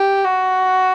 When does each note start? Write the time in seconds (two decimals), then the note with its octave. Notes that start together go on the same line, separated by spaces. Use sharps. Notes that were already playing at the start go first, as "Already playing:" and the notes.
Already playing: G4
0.24 F#4